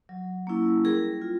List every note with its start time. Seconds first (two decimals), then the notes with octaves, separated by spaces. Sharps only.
0.09 F#3
0.47 A#3 C#4 E4
0.85 G3 G#4 A#4
1.22 F4